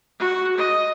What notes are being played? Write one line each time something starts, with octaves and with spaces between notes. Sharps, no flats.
F#4
D#5